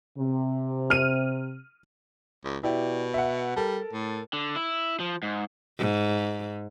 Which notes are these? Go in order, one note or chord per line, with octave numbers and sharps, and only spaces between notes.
C3
F6 D#7
C#2
B2 E4 G4 D5
E5 F#5
G3 A4 A#4
A2
D3
E4
F3
G#2
G#2